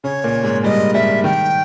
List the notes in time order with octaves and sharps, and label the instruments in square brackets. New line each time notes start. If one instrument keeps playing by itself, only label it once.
[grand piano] C#3 C#4 [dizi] C#5
[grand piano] A#2 A#3
G#2 G#3
[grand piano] G2 G3 [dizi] D#5
[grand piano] G2 G3 [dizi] E5
[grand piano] D#3 [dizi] G5